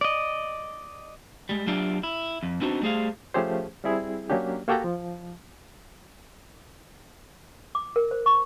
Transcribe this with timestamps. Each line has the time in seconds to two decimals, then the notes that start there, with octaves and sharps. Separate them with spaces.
0.01 D5 D#5
1.49 G3 G#3
1.67 F#3 D4 F4 G4 D5 E5
2.03 E4
2.43 F2
2.61 B3 C4 D4 D#4 F#4 C5
2.82 G3 A3 G#4 C5 F5
3.34 F3 A3 C#4 G4 G#4 C5
3.84 G3 C4 E4 G#4
4.30 F#3 A#3 C#4 D4 G4
4.68 A#3 F#4 G4 A4 G5 A#5
4.84 F3
7.75 D6
7.96 A#4
8.11 C5
8.26 C#6